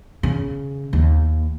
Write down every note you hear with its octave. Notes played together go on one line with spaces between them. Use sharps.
C#3
D#2